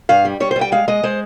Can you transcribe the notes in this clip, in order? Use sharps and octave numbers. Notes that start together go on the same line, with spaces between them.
G2 F5
G3
G3 C#5
G3 C5
G5
G#3 F5
G#3 D#5
G#3 C5